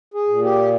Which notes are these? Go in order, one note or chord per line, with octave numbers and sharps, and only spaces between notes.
G#4
A#2
G4